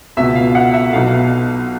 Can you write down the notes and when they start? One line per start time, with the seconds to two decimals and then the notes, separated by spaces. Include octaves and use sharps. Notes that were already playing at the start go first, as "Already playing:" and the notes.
0.17 C#2 B2 E5
0.35 F5
0.55 F#5
0.74 E5
0.93 B1 B2 F5